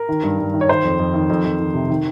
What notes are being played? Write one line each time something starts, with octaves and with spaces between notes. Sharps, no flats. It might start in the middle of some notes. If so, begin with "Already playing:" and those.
Already playing: A#4
D#3
G2
G2
D#3
C#5
D#3 C5
F2
F2
D#3
F2
F2
D#3
C3
D#3